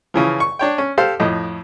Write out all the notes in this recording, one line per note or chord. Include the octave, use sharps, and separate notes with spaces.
C#3 E3 F3
C#6
D4 C#5 G5
C#4
G4 A4 C5 F5
F2 A2 D#5